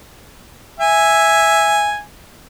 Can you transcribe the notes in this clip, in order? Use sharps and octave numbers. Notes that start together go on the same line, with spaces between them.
E5 G#5